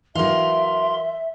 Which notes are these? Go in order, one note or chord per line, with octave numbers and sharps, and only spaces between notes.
E3 F#3 A#4 E5 F5 C6